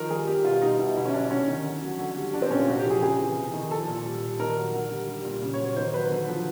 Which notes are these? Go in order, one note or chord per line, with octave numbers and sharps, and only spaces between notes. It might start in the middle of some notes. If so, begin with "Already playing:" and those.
Already playing: D#3 F3 A#4
G3 G#4
G3 G4
B2 F4
G3 D#4
B2 E4
D3 E4
C#4
F#3 D4
C3 C#4
D#3
D3
F#3
D3
G3
F3 D4
C4
A#2 C#4
F4
C3 F#4
G4
F3
G#4
C#3 G#4
E3
C3
D#3
F3 A4
A#2
G3
A#2
D#3 A#4
F#3
D3
G3
G3
A#2
C#3
C#5
F#3
C#5
D#3 C5
F#3 B4
D3
F3